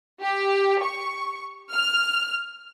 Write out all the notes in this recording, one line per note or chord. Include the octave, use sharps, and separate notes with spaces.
G4
C#6
F6